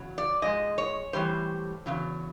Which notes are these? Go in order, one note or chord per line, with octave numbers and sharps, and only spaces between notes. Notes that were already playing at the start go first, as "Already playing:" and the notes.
Already playing: E2 C#3 F#3
D5
G#2 F3 G#3 D#5
C#5
A2 E3 G3 C5
E2 C#3 F#3